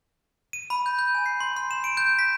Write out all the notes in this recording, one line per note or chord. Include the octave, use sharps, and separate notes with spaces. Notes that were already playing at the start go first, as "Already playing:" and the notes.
D#7
B5
G6
G6
G#5
C7
C6
C6
E7
D7
G6
B6